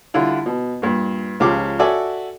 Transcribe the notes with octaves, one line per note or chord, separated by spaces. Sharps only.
D3 G3 E4 F4
B2
G2 A#2
C#2 C#3 F3 G4 D6
F#4 A4 D5 E5 G#5